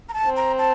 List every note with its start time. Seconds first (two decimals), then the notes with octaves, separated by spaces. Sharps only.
0.09 A#5
0.14 A5
0.25 C4
0.37 A#5
0.59 A5